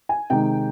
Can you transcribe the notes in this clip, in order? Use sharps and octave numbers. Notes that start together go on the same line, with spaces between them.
G#5
C3 D#3 G#3 D#4 G5